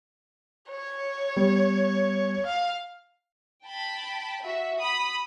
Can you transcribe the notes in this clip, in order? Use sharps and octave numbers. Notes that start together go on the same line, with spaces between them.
C#5
G3 B3
F5
G5 A5 B5
F#4 E5
B5 D#6